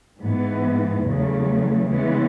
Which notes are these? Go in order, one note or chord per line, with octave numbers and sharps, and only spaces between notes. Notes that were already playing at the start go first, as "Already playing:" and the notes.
G#2 E3 B3
E2 C#3 F#3 A3
C#3 E3 G#3 B3